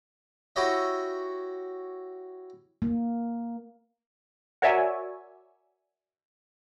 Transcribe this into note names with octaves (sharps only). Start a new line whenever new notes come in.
E4 F#4 G4 C#5 D#5 E5
A#3
F#4 A#4 C#5 D5 E5 G#5